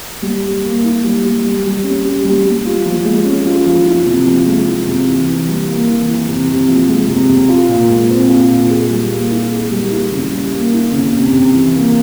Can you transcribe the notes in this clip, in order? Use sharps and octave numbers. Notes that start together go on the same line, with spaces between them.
G3
G3
A#3
E4
G3
G3
G3
G3
C#4
G4
G3
G3
F4
F3
G#3
C#4
F4
F3
E4
C3
F3
G#3
E4
C3
E3
E3
G3
A#3
E3
E3
C3
C3
F3
G#3
C3
C3
F4
A#2
G#3
C4
F4
A#2
G#4
G3
A#3
E4
G#4
G3
E4
C#3
G3
A#3
E4
C#3
C3
C3
E3
A#3